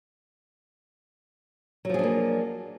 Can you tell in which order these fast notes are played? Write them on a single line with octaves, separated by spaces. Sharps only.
F#3 F3 G#4 D4 A#3